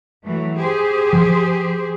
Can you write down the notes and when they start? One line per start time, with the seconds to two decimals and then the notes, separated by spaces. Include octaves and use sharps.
0.23 E3 F#3 A3
0.57 G4 G#4 C5
1.13 F3